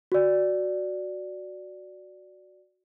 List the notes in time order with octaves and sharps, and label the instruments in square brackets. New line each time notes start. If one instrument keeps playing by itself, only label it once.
[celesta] F#4 D5